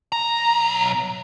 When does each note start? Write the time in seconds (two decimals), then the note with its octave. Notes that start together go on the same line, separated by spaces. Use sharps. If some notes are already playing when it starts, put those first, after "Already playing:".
0.12 B1 A#5